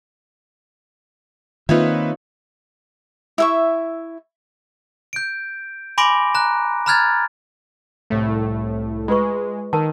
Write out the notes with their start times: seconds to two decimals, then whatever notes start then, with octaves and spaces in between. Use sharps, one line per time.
1.69 D#3 A#3 C4 D#4 F4 B4 C#5 E5
3.38 E4 E5 C#6
5.13 G6 D7
5.98 G#5 B5 C6 D6 A#6 D7
6.35 A#5 F#6
6.86 A#5 B5 F6 F#6 G#6 A6
8.10 C2 A2 A3
9.08 G#3 F4 B4 C#6
9.73 D#3 A#4 A5